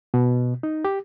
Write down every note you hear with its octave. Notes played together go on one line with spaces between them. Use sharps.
B2
D#4
G4